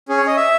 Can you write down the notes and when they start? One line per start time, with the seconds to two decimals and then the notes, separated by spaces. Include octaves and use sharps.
0.09 C#4 G#4
0.17 C#5
0.27 D#5
0.36 E5